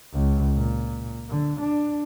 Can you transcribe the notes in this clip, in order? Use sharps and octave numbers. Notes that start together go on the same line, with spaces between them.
C#2
A#2
D3
D4